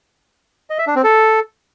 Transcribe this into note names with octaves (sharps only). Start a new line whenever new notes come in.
D#5
E5
D4
C4
A4